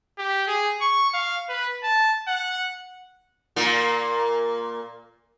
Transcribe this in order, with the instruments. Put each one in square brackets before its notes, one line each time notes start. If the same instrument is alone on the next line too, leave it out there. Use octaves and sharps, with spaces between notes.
[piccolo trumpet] G4
G#4
C#6
F5
B4
A5
F#5
[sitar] A#2 A#3